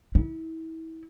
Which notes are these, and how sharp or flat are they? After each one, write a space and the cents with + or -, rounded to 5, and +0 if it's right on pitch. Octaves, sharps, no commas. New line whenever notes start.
E4 -30